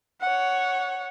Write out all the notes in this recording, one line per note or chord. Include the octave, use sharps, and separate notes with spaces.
C#5 F#5